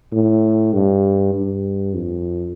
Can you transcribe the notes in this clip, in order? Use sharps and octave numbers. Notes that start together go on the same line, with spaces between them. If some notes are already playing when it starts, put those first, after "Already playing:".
A2
G2
G2
F2